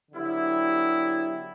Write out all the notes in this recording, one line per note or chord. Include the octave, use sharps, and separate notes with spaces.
D3 F#3 B3 E4 G4